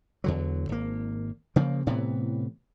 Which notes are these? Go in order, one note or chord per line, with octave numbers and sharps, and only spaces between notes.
E2 D3 F#3
G#1 A#3
C#3 F3 A#3
A2 C3 E3 B3